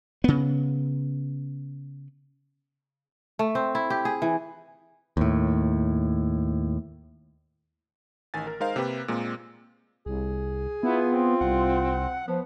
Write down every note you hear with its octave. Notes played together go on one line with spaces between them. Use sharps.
C#3 B3
A3
C4
E4
G4
G#4
E3
D#2 A2
A1 D#3 G#5 A6
A#4
G#3 D#4 A#4 C5 F5
C3 A#3 G4 B4
A#2 G#3 A#3 C4
C2 G#4
B3 E4 F4
C4
C2 F#5
F3 B3